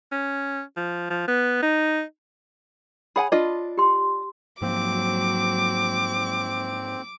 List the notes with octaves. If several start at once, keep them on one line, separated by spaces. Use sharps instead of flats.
C#4
F3
F3
B3
D#4
G#4 C#5 F#5 G#5 B5
D4 F4 D#5
G4 C6
G#2 F3 F#3 A#3 C4 D6